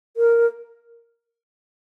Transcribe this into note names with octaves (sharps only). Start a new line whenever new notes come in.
A#4